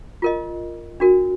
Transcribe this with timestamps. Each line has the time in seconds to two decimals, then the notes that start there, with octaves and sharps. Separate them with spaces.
0.22 F4 A#4 D#5
1.00 D4 F#4 A#4